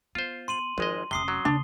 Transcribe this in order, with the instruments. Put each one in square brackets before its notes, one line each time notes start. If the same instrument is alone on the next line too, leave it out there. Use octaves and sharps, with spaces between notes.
[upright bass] B3 [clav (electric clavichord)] F4 C5
[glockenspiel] C6 D#7 F#7
[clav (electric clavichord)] G#1 G#3 D#5 [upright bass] F3
[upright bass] F1 C#4 [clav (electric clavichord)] C3 [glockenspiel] D#6 C7 G7
[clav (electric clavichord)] F#3
[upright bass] D#2 C#3 [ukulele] D4